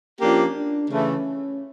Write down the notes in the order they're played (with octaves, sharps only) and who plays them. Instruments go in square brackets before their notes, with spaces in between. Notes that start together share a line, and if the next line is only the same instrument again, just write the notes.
[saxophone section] F3 A#3 D4 G4 [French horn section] C#4
[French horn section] D4
[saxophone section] C#3 E3 A3 [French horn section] C#4